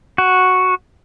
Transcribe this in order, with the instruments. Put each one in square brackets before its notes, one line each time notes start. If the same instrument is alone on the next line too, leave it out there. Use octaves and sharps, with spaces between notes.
[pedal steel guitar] F#4